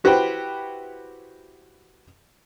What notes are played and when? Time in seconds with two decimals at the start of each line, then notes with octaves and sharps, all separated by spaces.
0.04 E4 F#4 G4 B4 C5 G5